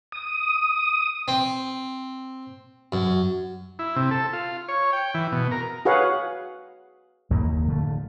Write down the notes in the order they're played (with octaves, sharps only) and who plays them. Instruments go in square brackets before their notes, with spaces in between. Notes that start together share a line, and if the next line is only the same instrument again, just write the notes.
[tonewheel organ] D#6
[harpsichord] C4
F#2
[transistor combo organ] E4
C3
A4
F4
C#5
G5
E3
B2
A#4
[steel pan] F#4 G#4 B4 C#5 F5 F#5
[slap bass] F#1 D#2 A#3
D1 D3 F3 A3